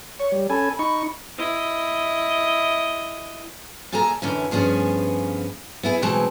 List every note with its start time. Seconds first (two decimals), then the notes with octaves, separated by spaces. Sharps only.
0.20 C#5 C#6
0.32 G3
0.50 C#4 A4 G#5 B5
0.79 D#4 B5 C#6
1.38 E4 D#5
3.92 A#2 G#4 A4 G#5 A#5
4.22 F#2 D3 E3 C#4
4.51 G2 F3 B3 C#4 G#4
5.83 B3 E4 G#4
6.02 B2 E3 F#3 G#3 C4 A5